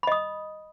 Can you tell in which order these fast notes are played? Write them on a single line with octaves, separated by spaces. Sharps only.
B5 D#5 D#6